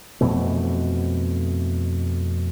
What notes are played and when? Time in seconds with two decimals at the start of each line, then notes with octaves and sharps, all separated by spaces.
0.21 F2 B2 E3 A3